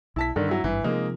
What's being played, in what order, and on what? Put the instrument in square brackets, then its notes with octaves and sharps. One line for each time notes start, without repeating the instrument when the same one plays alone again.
[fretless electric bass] B1 [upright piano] E4 A5 B6
[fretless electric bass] G2 [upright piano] D3 D#3
[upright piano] F#3 E4
[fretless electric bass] G#1 G2 [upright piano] E3
[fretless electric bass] C3 F3 [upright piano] G#3 A#3 D#4